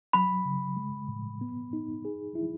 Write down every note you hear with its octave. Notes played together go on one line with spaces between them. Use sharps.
F#3 B5
C#3
G#3
A2
B3
D#4
G#4
E4